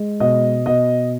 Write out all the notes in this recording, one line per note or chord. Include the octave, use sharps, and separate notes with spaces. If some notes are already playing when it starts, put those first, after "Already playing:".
Already playing: G#3
B2 D#5
B2 D#5